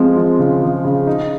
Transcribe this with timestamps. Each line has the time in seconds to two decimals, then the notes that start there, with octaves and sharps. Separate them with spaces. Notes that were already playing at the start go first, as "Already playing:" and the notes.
Already playing: F3 G#3 C4
0.17 F3
0.39 C#3
0.62 F3
0.85 C#3
1.07 D#4